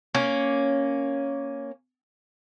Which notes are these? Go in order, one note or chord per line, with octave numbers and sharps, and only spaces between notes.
A#3 C#4